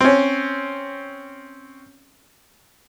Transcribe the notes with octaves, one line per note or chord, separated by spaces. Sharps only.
C4 C#4